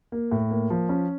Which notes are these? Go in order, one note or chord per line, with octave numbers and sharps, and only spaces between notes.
A#3
A2
A#3
F3
C#4